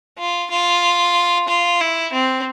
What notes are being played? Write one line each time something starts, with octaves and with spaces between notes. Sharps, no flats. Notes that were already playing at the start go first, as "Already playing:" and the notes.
F4
F4
F4
E4
C4